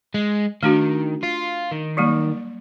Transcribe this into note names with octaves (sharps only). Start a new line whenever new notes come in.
G#3
D#3 A3 D4 F#4
F4
D#3
F#3 G3 A#3